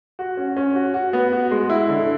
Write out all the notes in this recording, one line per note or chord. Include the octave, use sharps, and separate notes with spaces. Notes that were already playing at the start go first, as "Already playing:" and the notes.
F#4
C#4
C#4
F#4
F#4
B3
F#4
G#3
E4
D3